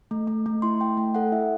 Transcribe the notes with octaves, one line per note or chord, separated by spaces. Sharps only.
A3
A3
A3
E4 C6
A3 G5
A3 G5
A4 F#5
E4 E5